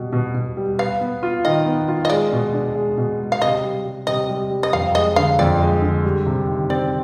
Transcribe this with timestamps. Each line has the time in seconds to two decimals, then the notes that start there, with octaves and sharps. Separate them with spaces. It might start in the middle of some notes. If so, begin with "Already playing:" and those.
Already playing: B2 G3 B3
0.13 B2
0.35 B2
0.57 G3
0.79 B4 F5
1.01 B3
1.23 F4
1.45 D#3 D#5
1.66 B3
1.88 F4
2.05 D#5
2.10 G#3 D5
2.33 B2
2.53 D4
2.75 G#3
2.98 B2
3.20 G#3
3.32 F5
3.41 C3 D#5
3.64 G3
3.85 G3
4.07 C3 D#5
4.29 G3
4.50 G3
4.63 D#5
4.73 F2 F5
4.95 G#3 D#5
5.16 D3 F5
5.39 F2 D5
5.61 G#3
5.82 D3
6.04 G3
6.26 C3
6.48 D#3
6.70 C4 D5